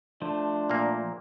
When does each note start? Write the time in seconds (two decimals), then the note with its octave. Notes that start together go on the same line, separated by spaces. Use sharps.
0.22 F3 A3 D4 C5
0.70 A#2 A#3